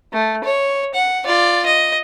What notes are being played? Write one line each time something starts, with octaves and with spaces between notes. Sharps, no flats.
A3
C#5
F#5
F4 D5
D#5